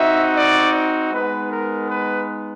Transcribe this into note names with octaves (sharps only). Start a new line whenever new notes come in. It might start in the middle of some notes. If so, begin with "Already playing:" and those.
Already playing: C4 D#4 F#4 E5
D5
G#3 B3 D#4 B4
A#4
B4